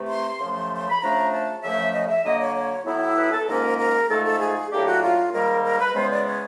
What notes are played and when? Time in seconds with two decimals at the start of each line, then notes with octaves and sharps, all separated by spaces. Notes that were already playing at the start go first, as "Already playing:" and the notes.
Already playing: C3 E3 A3
0.08 C6
0.40 F#2 C#3 F3 A3
0.77 C6
0.89 B5
1.01 C#3 F3 A3 D4 A#5
1.31 A5
1.63 F#2 C#3 F3 A3 E5
1.93 D#5
2.09 E5
2.24 D3 F#3 A#3 D#5
2.41 C#5
2.56 C#5
2.86 A2 F#3 B3 E4
3.18 B4
3.32 A4
3.48 G#2 F3 A#3 C#4 A#4
3.78 A#4
4.10 G#2 F3 A3 A4
4.25 A4
4.41 G#4
4.71 A2 F#3 A#3 D4 G4
4.87 F#4
5.02 F4
5.33 G#2 D#3 G3 A#3 A#4
5.64 A#4
5.80 B4
5.95 C#3 E3 G#3 B3 C5
6.11 D5
6.27 C#5